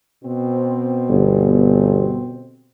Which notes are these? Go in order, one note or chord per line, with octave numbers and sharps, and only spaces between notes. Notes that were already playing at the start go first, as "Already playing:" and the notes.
B2 C4
G1